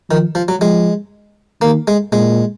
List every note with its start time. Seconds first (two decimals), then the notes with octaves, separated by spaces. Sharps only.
0.10 D#3 F3
0.35 F3
0.48 F#3
0.60 F3 G#3
1.61 D#3 A#3
1.88 G#3
2.12 A#2 G#3